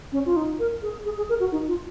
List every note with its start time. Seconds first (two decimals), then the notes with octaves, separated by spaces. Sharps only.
0.12 C#4
0.26 F4
0.36 D#4
0.59 A#4
0.82 G#4
1.05 G#4
1.17 G#4
1.29 A#4
1.40 F#4
1.52 D#4
1.68 F4